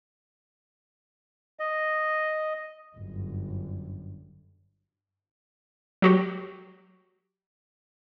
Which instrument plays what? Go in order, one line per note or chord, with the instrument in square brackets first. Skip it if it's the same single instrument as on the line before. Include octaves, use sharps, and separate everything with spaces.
[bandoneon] D#5
[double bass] G1 F#2
[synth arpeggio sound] F#3 F#4 G4